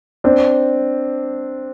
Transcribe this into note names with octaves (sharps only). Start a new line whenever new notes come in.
C4 D4